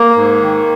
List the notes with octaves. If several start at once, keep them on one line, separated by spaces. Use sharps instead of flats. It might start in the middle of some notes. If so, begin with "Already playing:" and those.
Already playing: A#3
G#2
D#3